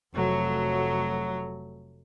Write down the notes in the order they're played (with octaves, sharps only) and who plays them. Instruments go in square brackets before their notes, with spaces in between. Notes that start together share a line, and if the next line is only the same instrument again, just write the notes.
[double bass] F1 A3 [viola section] F#3